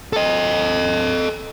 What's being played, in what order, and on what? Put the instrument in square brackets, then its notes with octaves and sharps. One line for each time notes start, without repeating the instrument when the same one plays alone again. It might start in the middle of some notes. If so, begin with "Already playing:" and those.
[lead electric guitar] A4 D#5